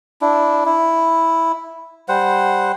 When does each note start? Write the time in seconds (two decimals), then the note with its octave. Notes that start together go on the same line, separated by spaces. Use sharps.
0.21 D4 E4
0.66 E4
2.08 G3 C5 F#5